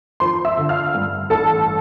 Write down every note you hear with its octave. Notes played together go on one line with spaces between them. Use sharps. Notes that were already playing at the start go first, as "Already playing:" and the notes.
F3 C5 C6
E5 E6
D3
F5 F6
G2
A1 A4 A5